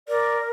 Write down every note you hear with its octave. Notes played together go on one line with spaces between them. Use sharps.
A#4 D5